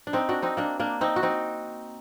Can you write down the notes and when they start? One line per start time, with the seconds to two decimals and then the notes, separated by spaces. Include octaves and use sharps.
0.07 D4
0.13 C4 D#4
0.29 D4 F#4
0.42 C4 D#4
0.57 A#3 D4
0.80 A#3 D4
1.01 C4 D#4
1.16 F#4
1.23 C4 D#4